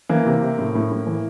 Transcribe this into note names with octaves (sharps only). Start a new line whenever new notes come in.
E3 A#3
C3
C3
A2
A2
A2
E3